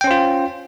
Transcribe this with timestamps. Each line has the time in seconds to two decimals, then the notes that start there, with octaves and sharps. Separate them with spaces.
0.01 G5
0.04 C#4
0.07 C5
0.11 F4